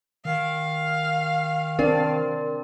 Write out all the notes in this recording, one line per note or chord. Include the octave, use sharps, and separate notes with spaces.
D#3 F5
C4 D4 A#4 D5